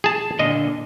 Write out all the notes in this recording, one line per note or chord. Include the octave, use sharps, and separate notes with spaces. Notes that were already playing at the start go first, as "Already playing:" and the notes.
G#4 A5
A#2 D3 D#5